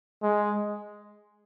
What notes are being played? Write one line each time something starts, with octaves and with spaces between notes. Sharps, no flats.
G#3